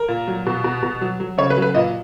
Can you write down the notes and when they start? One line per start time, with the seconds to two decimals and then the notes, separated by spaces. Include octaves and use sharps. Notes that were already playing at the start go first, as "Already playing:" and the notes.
Already playing: A#4
0.08 A#2
0.27 F#3
0.46 B2
0.64 B2
0.83 B2
1.01 F#3
1.20 F#3
1.38 C#3 C#5
1.50 B4
1.57 F#3
1.62 B4
1.75 A#2 D#5